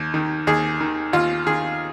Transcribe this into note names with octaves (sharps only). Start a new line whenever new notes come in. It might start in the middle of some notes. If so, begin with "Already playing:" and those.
Already playing: D#2
D#3
D#2 G#4
D#3
D#2 F4
D#3 G#4